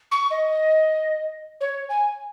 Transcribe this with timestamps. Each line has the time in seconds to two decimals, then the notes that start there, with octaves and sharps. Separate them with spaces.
0.11 C#6
0.31 D#5
1.61 C#5
1.89 G#5